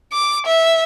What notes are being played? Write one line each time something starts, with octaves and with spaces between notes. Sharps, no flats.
D6
E5